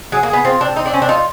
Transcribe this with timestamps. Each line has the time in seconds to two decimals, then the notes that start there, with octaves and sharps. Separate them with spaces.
0.12 F#3 G#4
0.23 A#3
0.29 B3 G#4
0.45 C4 F4
0.61 C4 D4
0.76 C4 D#4
0.86 D4
0.93 C4 C#4
1.02 D4
1.09 D#4 F4